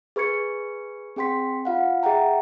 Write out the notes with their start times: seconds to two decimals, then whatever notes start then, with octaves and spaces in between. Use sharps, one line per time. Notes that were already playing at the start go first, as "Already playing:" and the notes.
0.16 G#4 B4 C#6 G#6 C#7
1.16 C4 G#4 G5 C6 B6
1.65 F4 F5 F#5
2.03 G#4 E5 F#5 G5 A#5